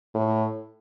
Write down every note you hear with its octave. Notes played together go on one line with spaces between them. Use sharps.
A2